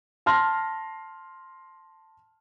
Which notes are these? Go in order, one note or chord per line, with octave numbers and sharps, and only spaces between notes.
A5 C6 F6 A#6